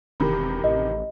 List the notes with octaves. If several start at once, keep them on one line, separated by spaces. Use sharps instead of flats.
E1 C3 D#3 E3 G4 B5
A1 D#5